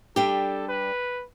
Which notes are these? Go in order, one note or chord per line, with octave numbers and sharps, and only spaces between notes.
G3 D4 G4 A4
B4